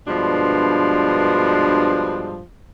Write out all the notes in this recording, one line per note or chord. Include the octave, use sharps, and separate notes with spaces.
G2 B2 F3 G#3 D4